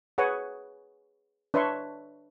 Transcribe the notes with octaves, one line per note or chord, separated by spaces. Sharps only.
G#4 B4 C#5 F#5 G#5
D4 B4 C#5 E5 C6 C#6